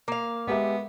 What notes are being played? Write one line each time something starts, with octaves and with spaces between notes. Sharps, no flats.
A#3 F5
G#3 B3 G4 E5